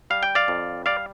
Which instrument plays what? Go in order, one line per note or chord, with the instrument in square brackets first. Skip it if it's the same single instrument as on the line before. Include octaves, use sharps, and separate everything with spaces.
[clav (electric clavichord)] G3 F5
G5
D5 F5
F2
G3 D5 F5